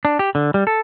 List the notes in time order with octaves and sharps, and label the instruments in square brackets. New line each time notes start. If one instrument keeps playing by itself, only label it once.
[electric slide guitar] D4
G4
D3
G3
A4